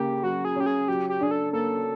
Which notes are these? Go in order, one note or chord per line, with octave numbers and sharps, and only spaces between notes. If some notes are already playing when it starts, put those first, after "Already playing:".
Already playing: C#3 A#3 G4
F#3 F#4
G#4
C#4 G4
G#4
F#3 G4
G4
D4 G#4
A4
A#3 A4